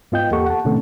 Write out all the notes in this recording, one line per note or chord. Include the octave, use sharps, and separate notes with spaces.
G#2 B3 F4 D#5 G5 G6
E2 A#3 G4 A4 F#5 C#6
F#5 A5
A2 C3 D#3 A3 C#4 A4